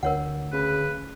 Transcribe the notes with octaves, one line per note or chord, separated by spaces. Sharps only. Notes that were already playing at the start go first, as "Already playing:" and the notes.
D2 A#4 C#5 F#5
C#3 B4